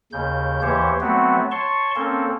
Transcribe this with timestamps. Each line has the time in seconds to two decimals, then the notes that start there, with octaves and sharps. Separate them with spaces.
0.13 D#2 C#3 G6
0.62 D#2 E3 G4 C5 C#5
1.01 F#3 A3 B3 C4 F#4
1.51 C#5 A5 C6 C#6
1.96 A#3 C4 C#4 A4